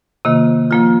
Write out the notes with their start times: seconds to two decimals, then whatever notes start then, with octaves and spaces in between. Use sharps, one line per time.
0.25 C3 D#3 A#3 F4
0.71 F3 A#3 F4